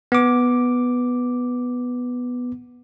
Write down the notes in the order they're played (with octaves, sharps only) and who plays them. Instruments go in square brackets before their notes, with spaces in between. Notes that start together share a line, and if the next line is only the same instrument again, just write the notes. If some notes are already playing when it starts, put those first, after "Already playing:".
[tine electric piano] B3 D6